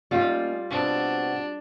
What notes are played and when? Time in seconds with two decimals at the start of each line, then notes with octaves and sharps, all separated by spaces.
0.11 G3 A#3 C#4 D#4 F4
0.70 B2 C4 D4 F#4